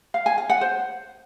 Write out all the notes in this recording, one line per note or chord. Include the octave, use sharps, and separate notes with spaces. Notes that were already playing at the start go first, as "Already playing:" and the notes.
F5
G#5
F5
F#5
C5